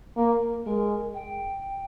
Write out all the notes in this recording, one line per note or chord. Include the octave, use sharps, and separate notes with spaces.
A#3 A#4
G#3 A#4
G5